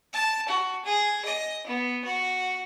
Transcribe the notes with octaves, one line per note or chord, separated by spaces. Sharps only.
A5
F#4
G#4
D#5
B3
F#4